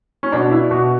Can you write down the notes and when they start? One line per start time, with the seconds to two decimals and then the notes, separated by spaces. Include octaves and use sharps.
0.23 C#4
0.32 B2 D4
0.51 E4
0.71 B2 F#4